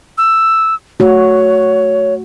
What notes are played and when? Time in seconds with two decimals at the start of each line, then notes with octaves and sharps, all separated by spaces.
0.18 E6
1.00 A3 F#4 C#5